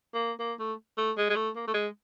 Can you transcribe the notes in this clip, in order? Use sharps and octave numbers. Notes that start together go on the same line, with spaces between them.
A#3
A#3
A3
A3
G#3
G#3
A3
A#3
A3
G#3